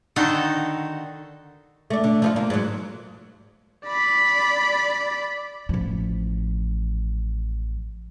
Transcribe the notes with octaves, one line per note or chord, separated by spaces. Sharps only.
D3 D#3 D#4 F#4 A4
A3 D4
D3
F3 D#4 F4
A#3
G#2 F#3
D5 B5
A1 F3